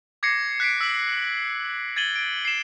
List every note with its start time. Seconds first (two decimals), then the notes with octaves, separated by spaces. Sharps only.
0.23 D6 G#6 A#6 C7 C#7
0.60 F#6 B6 C7 D7
0.81 E6 B6 D7 F#7
1.96 G#6 A6 D#7 F#7 G7
2.16 D7
2.45 C7 E7